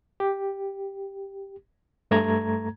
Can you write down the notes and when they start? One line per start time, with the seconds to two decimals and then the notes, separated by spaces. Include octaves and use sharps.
0.20 G4
2.11 G2 A3 A#5 G#6